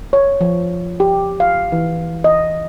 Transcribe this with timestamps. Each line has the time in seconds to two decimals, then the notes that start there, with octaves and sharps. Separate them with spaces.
0.13 C#5
0.41 F3
1.00 G4
1.40 F5
1.72 E3
2.24 D#5